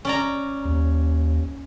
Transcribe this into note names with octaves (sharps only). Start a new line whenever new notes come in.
C#4 D5 A#5
D#2